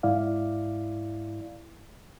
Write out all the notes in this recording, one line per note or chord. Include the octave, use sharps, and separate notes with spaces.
G#2 E4 D5 F5